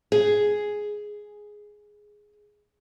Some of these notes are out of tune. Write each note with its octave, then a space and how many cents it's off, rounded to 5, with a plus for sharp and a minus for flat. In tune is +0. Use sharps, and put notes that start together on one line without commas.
G#4 +5